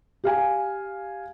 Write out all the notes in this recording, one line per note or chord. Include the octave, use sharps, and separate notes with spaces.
G4 F5 G#5